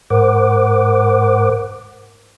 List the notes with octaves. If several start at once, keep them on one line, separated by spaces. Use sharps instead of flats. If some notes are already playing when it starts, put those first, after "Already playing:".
G#2 A#4 C5 F#5 D6